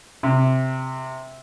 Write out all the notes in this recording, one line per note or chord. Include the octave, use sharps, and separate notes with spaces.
C3